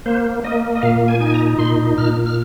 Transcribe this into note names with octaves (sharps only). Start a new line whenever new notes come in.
A#3 C5
A#3 D#5
D#5
A#2 F5
G#5
D#4 G#5
A#5
A#2 C6
A#2 F6
F6